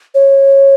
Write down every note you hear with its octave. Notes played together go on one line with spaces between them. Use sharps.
C#5